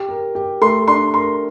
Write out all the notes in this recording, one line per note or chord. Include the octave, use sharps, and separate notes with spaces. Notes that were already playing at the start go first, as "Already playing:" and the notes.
Already playing: G4
A#4
G4
A3 C6
D4 C6
A#4 C6